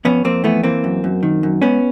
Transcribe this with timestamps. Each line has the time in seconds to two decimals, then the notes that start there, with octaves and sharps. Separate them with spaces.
0.05 F2 B3 C#4
0.25 F2 A#3 C4
0.44 E3 A3 B3
0.63 E3 A#3 C4
0.84 F#2
1.04 F#2
1.23 D#3
1.43 F#2
1.62 G#2 B3 C#4